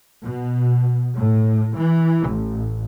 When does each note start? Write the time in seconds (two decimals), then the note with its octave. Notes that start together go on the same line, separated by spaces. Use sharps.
0.24 B2
1.17 A2
1.77 E3
2.28 A1